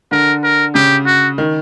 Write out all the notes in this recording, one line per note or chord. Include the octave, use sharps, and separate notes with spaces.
D3 A#4
A#4
C#3 G4
F#4
D#3